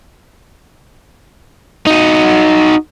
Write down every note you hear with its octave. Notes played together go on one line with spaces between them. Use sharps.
D#4 F#4